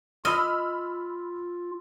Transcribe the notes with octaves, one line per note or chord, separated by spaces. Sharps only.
F4 D#5 B5 E6 F6